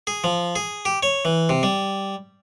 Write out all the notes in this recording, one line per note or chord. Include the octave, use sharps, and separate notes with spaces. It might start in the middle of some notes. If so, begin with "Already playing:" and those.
G#4
F3
G#4
G4
C#5
E3
C3
G3